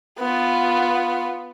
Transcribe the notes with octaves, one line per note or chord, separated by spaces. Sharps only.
B3 F4